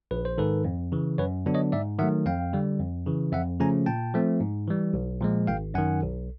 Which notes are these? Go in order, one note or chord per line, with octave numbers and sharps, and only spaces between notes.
A#1 B4
C5
G#2 D#3 A4 B4
F2
C#3 E3
F#2 B4 C#5
D3 F#3 B3 D4
C#5 D#5
G#2 D5 E5
D#3 F#3 A3 E5 F#5
F2 F5 G5
D3 G3
F2
C#3 E3
F2 E5 F#5
C#3 F3 A3 C#4 G#5 A#5
A#2 G5 A5
F3 A3 C4
G#2
E3 G3
B1
A#2 F3 G#3
G#1 F5 G5
F#2 D#3 F#5 G#5
B1